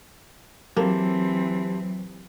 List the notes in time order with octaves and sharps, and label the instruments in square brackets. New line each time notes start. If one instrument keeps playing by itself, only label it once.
[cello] E3 C4 [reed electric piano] F#3 [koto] A#3 [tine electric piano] G4 A5